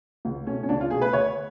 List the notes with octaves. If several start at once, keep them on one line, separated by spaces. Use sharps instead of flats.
C#2
B2 A3 C#4
C#4
C#2 D4
F4
B2 A3 G#4
B4
D2 C#5